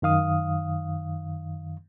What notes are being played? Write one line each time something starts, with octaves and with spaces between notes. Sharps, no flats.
F#2 D#3 F5 D#6